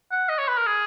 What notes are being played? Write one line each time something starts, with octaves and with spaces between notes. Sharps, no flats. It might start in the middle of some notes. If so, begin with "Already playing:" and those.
F#5
D#5
C#5
B4
A#4
G#4